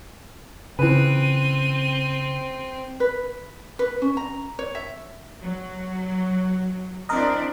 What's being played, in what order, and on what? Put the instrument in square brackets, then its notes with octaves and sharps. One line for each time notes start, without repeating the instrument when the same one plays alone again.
[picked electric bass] C#3 [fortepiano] E3 B4 [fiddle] C4 [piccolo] D#7
[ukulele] B4
B4
C#4
A#5
C#5
E5
[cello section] F#3
[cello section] C4 D4 E4 [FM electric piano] A#4 D#5